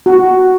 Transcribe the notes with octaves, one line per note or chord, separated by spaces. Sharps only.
F#4